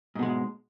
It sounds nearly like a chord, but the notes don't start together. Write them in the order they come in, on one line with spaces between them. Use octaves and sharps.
G#2 B2 G#3